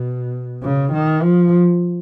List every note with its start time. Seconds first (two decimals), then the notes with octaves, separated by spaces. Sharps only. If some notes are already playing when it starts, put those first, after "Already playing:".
Already playing: B2
0.63 C#3
0.93 D#3
1.23 F3